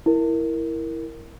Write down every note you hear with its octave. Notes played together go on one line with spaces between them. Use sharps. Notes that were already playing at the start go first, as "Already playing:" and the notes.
E4 A#4